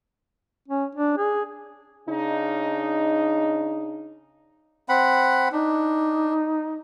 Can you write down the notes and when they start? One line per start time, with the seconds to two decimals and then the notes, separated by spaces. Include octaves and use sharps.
0.68 C#4
0.95 D4
1.18 G#4
2.08 C#3 D4 D#4
4.89 C4 F#5 B5
5.52 D4 D#4